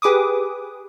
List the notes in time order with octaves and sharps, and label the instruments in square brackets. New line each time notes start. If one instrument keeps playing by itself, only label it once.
[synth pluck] G4 G#4 B4 D6 D#6